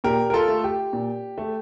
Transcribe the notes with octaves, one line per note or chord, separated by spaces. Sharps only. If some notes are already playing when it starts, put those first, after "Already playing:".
A#2 G4 A#4
A#4
F4 A4
A3
G4
A#2
A3